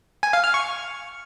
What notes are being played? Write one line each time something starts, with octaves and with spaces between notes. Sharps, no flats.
G#5
F5
F6
C#6